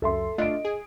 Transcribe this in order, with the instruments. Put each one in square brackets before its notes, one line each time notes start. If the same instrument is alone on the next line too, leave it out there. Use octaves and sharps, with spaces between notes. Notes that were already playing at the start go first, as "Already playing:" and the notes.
[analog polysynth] C#2 F#2 [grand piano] A4 E5 C6
[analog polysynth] A3 D4 F4 [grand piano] D#5 D7
[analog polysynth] G#4